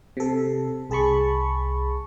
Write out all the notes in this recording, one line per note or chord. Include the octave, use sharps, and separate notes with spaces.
C3 A4
C2 G#4 A5 B5 C#6